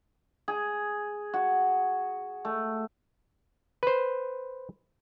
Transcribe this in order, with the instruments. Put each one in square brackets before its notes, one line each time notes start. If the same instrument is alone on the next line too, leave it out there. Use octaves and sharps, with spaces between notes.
[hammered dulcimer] G#4
F#4
A3
[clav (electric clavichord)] B4 C5